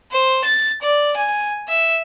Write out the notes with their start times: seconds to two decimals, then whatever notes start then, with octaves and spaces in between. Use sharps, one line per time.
0.11 C5
0.45 A6
0.82 D5
1.17 G#5
1.68 E5